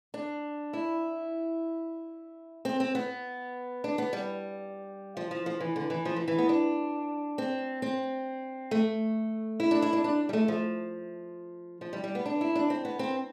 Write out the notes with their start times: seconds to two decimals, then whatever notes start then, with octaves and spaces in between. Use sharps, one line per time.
0.14 D4
0.73 E4
2.65 C4
2.80 C4
2.95 B3
3.84 D4
3.98 B3
4.13 G3
5.17 F3
5.31 F3
5.46 F3
5.60 E3
5.76 D3
5.90 E3
6.05 F3
6.16 E3
6.28 E3
6.38 B3
6.49 D4
7.38 C4
7.82 C4
8.71 A3
9.60 E4
9.71 D4
9.82 E4
9.93 D4
10.04 D4
10.29 G3
10.33 A3
10.48 F3
11.81 F3
11.93 G3
12.04 G3
12.15 B3
12.26 D4
12.41 E4
12.55 D4
12.70 C4
12.85 B3
12.99 C4